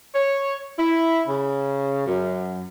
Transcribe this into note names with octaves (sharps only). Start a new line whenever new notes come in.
C#5
E4
C#3
F#2